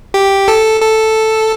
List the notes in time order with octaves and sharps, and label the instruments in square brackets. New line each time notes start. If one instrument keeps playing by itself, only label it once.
[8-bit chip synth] G4
A4
A4